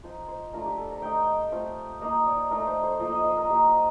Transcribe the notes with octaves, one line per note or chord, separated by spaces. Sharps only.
F3 C4 D#4 C5
C5
A3 D4 F4 A#4
G4
A4
A#4
A3 D#4 G5
A3 C4 F4
A#3 D#4 D#5
D5
A3 D#4 A#4
C5
C5
F3 A#3 F4 D#5
D#5
C5
A#4
A#3 D#4 G4
F4